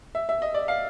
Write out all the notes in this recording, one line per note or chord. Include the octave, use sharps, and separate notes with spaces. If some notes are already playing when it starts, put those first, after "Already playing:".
E5
E5
D#5
D5
F5